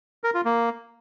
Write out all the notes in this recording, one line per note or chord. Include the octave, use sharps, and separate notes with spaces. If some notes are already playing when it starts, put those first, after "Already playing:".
A#4
F4
A#3